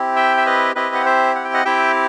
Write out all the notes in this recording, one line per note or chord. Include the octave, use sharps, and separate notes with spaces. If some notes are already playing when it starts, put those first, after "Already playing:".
Already playing: C4 E4 G4
E5 G5
E5
B4 D#5
C4 E4 G4 B4 D#5
F#5
C5 E5
F#5
G5
D#5 F#5
C4 E4 G4 E5 G5